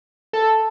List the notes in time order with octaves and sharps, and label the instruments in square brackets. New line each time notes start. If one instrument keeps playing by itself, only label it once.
[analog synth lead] A4